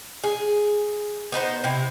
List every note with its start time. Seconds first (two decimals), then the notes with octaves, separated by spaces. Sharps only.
0.24 G#4
1.32 B3 D#4 B4 C5
1.64 C3 E4